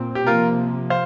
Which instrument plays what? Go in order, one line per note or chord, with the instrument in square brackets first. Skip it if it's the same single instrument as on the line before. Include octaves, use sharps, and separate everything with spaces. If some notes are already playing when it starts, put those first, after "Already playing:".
Already playing: [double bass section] A#2 C4
[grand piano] G4
[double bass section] C3 F3 A#3 [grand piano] F4 A#4
[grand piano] C5 F5